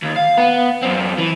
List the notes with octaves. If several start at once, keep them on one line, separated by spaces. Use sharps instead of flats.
D#2
F5
B3
F#2 C4
E3